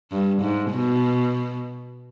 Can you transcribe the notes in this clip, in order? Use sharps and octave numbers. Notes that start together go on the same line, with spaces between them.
G2
G#2
B2